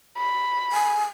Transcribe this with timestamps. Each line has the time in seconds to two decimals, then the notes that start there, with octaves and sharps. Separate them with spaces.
0.17 B5
0.72 G#5